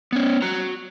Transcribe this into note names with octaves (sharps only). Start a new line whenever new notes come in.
B3 C#4
F#4 A#5